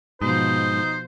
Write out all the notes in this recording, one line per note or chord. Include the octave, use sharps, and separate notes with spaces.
G#2 B2 F3 D#4 C5